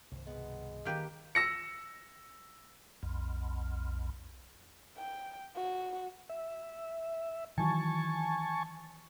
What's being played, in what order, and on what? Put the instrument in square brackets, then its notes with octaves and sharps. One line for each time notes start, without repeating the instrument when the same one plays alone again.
[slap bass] C2 G2 D#3 [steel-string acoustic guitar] C5 C#5
[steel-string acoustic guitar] B2 B3 [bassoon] G#3
[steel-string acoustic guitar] D#3 [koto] A#3 G4 B4
[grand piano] E6 A#6 C#7
[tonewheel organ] B1 F2
[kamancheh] G5
F#4
[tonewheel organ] E5
[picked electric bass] D#3 E3 F#3 [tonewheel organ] G#5 A5 C#6